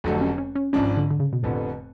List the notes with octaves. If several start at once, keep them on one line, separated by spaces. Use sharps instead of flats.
F1 F2 D3 F#3 A3
C#4
C#4
C#4
G#1 G#2 F3 G#3 C#4 D4
D3
D3
C#3
B2
F1 F2 A2 D3 F3 B3